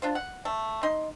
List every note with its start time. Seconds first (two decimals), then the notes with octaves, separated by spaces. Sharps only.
0.02 D4 F4 C5
0.15 F#5
0.45 A3
0.83 D#4 C6